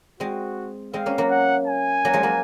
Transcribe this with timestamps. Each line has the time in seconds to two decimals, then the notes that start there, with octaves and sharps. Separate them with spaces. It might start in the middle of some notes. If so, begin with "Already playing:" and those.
0.20 G#3 C4 F#4
0.93 G#3 C4 F5
1.06 A#3 C#4
1.18 F#3 A#3
1.31 F#5
1.67 G#5
2.05 F#3 A#3
2.13 F3 G#3
2.23 F#3 A#3